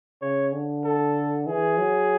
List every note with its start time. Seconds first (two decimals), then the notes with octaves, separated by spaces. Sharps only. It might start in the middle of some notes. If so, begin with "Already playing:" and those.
0.22 C#3 C#5
0.53 D3
0.84 A4
1.46 E3 G#4
1.78 F#3